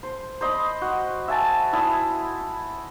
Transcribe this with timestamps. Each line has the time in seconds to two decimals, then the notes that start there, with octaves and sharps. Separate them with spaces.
0.03 C5
0.41 C5 D#5 B5
0.81 F#4
1.28 E5 G#5 A5
1.73 E4 A5 D#6